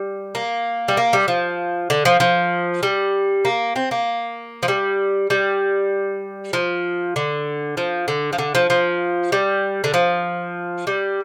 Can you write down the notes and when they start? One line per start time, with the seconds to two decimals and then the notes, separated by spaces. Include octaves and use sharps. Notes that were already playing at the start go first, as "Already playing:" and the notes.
Already playing: G3
0.35 A#3
0.88 G3
0.97 A#3
1.13 G3
1.28 F3
1.90 D3
2.05 F3
2.20 F3
2.83 G3
3.45 A#3
3.76 C4
3.91 A#3
4.63 F3
4.68 G3
5.30 G3
6.53 F3
7.16 D3
7.77 F3
8.08 D3
8.33 F3
8.38 D3
8.55 F3
8.70 F3
9.32 G3
9.84 D3
9.94 F3
10.87 G3